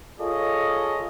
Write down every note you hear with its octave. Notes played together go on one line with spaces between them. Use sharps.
F4 G#4 A4 C#5 D#5